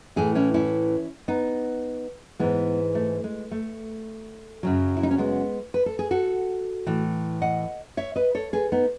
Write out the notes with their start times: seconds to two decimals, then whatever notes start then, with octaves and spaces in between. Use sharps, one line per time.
0.16 A2 E3 E4 G#4
0.35 C#4 E4
0.54 C#4 E4
1.28 B3 D#4
2.39 G#2 E3 G#3 B3
2.95 A3
3.24 G#3
3.51 A3
4.63 F#2 C#3 F#3
4.97 E4
5.03 D#4
5.11 C#4
5.18 G#3 B3
5.74 B4
5.86 A4
5.99 G#4
6.11 F#4 A4
6.86 A2 E3
7.42 D#5 F#5
7.97 C#5 E5
8.16 B4 D#5
8.35 A4 C#5
8.53 G#4 B4
8.72 B3 D#4